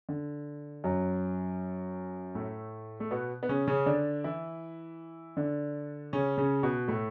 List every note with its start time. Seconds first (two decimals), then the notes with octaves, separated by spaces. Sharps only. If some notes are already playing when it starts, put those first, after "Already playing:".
0.09 D3
0.84 F#2 F#3
2.35 A2 A3
3.00 A3
3.11 B2 B3
3.43 B3
3.49 C#3 C#4
3.67 C#3 C#4
3.86 D3 D4
4.24 E3 E4
5.37 D3 D4
6.13 C#3 C#4
6.38 C#3 C#4
6.63 B2 B3
6.88 A2 A3